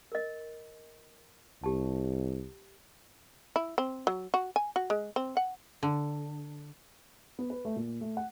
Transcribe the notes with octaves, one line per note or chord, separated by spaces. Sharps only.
A#4 D#5
C2 G4 A5
E4
C4
F#3
F#4
G#5
F#4
G#3
C4
F#5
D3
B3
B4
A3
A#2
A3
F#5